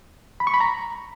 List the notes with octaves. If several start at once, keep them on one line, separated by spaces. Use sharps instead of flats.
B5
C#6
B5
A#5